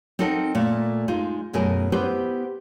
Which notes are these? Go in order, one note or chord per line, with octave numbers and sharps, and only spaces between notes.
C4 D#4 A4 A#4 D#5 F#5
A#2 A3
G#3 D#4 F4
F#2 B2 A3 G#4 A#4
B3 E4 G4 B4 C5